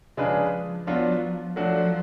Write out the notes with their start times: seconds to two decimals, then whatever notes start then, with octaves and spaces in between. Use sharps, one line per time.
0.17 C#3 F3 G#3 D4 G#4 B4
0.87 F#3 B3 D4 F4
1.56 F3 F#3 A3 D4 F#4